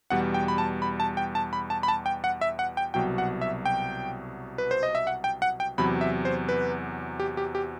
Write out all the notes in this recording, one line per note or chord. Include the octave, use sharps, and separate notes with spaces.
E2 B2 G3 F#5
G5
B5
A5
B5
A5
G5
A5
B5
A5
B5
A5
G5
F#5
E5
F#5
G5
C2 B2 F#3 G5
F#5
E5
G5
B4
C5
D#5
E5
F#5
G5
F#5
G5
E2 C3 F#3 B5
E5
C5
B4
G4
G4
G4